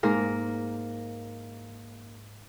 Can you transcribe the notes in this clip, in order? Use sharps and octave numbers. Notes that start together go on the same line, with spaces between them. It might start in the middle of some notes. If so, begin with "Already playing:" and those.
G#2 A#3 A#4